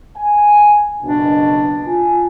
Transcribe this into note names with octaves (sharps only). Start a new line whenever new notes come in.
G#5
F#1 B2 D4
F4 G#5